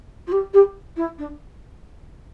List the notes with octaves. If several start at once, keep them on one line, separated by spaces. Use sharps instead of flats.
F4
G4
G4
E4
D4